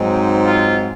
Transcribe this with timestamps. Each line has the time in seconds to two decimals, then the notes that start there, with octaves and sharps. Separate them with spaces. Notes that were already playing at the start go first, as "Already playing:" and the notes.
Already playing: G#2 F#3 C4 D#4
0.46 F4